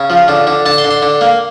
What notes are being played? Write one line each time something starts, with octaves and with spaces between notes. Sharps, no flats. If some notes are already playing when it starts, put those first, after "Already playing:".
Already playing: C#3
F3
D3
D3
D3 A5
C6
D3
C6
D3
A#3